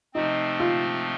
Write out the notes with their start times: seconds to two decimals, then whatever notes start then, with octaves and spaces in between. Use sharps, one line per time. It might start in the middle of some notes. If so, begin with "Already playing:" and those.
0.14 C3 F3 A3 C4 D#4
0.60 F4